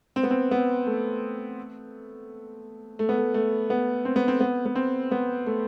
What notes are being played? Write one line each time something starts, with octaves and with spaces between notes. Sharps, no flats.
C4
B3
C4
B3
A3
A3
B3
A3
A3
B3
C4
B3
C4
B3
B3
C4
B3
A3